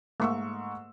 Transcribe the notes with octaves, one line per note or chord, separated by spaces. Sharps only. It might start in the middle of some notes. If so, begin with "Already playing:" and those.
G#2 A3 A#3 C#6 E6